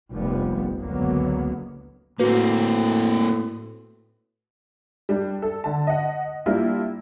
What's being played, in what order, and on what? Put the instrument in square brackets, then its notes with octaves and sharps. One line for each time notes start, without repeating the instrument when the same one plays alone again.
[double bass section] F1 A#1 A#2 F3 G3 B3
F#1 C#2 D3 F#3 A#3 B3
[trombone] A2 [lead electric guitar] A#3 C4 [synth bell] F#4 B4
[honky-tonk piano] G3 D4
A4
D3 A5
D#5 F#5
G3 A#3 D4 E4 F4